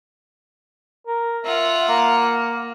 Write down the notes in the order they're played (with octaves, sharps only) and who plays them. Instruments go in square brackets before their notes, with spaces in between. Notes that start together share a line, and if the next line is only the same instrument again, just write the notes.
[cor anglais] A#4
[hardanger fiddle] F4 F#5 [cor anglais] E5
[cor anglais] A#3